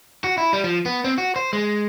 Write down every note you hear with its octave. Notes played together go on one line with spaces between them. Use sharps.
F#4
E4
G3
F3
B3
C4
F#4
C5
G#3